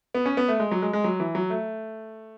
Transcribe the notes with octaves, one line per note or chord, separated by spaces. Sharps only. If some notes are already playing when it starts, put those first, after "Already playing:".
B3
C#4
B3
A3
G#3
F#3
G#3
G#3
F#3
E3
F#3
A3